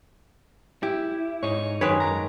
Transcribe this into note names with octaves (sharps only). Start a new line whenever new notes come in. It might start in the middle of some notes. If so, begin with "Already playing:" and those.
E4 G4
G#2 D#4 C#5
F#2 D#3 G#3 B4 C#5
A#5